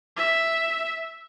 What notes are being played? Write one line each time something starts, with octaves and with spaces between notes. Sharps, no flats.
E5